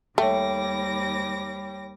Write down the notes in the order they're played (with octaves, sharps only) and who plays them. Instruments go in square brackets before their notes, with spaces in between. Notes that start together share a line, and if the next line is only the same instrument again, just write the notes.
[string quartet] D#2 D6 A#6 [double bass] G3 [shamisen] A3 [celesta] C#5 G5